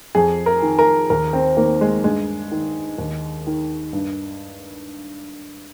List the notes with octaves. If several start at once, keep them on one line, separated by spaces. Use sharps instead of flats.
F2 G#4
A#4
D#3
A#4
D#2 A#4
C4
D#3 A#3
G#3
G2 G#3
D#3
D#2
D#3
G2